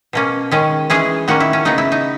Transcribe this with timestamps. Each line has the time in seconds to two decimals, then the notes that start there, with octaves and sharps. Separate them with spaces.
0.13 B2 A#3 C#4
0.51 D#3 G#3 C#4
0.90 E3 G#3 C#4 G#4
1.28 D#3 A#3 C#4 F#4
1.40 E4
1.53 C#4
1.65 C#3 G#3 B3 D#4
1.78 E4
1.92 D#4